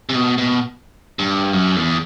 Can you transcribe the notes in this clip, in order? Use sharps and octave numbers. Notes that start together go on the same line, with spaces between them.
C3
B2
B2
G2
F#2
E2